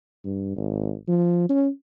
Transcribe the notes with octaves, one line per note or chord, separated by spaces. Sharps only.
G2
G#1
F3
C#4